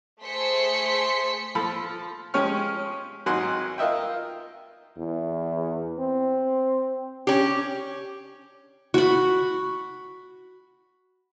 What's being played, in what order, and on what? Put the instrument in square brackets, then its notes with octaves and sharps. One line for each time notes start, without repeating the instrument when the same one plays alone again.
[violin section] A3 G#4 C5 C6 B6 C#7
[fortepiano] F3 A4 B5
F3 G#3 C#4 G4 C#5 F6
G#1 F#3 D#4 F#5 G#5 C6
F4 A#4 D#5 E5 G5
[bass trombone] E2
C4
[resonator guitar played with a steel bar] C#4 G4 [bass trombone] D4
[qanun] F#4 B5